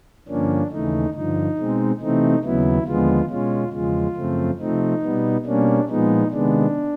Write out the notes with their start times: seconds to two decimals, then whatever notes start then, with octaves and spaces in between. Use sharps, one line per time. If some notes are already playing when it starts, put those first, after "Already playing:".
0.28 G2 D3 F3 A#3 C#4 D4
0.71 D#2 C#3 E3 A3 D#4
1.14 G2 D3 F3 D#4
1.57 B2 G#3 C4
2.00 C3 E3 A3 C4 D#4
2.44 D#2 C#3 F#3 B3 E4
2.86 D#2 D3 F3 G#3 B3 F4
3.30 B2 G#3 C#4 F4
3.73 E2 C#3 F3 G#3 F4
4.16 F#2 C#3 F3 A3 C4
4.59 C3 F3 A3 C4 D#4
5.02 B2 G3 B3
5.45 B2 G3 A#3 C#4 D4
5.89 A#2 F3 G#3 B3 D#4
6.31 C3 D#3 G#3 B3 D4